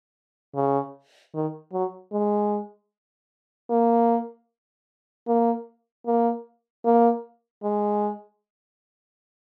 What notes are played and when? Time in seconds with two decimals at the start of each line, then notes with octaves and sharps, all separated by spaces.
0.55 C#3
1.34 D#3
1.73 F#3
2.12 G#3
3.70 A#3
5.27 A#3
6.06 A#3
6.85 A#3
7.63 G#3